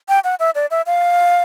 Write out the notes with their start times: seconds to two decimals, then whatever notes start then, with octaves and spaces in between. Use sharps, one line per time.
0.09 G5
0.24 F#5
0.40 E5
0.55 D5
0.71 E5
0.86 F5